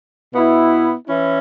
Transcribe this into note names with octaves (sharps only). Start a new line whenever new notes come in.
B2 B3 E4
E3 C#4 E4